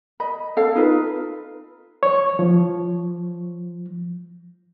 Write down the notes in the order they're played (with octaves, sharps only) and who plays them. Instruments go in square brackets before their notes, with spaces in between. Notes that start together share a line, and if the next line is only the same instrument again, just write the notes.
[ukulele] D#5 B5
A4 C#5 F5
D#4 F4 B4
[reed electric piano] C#5
F3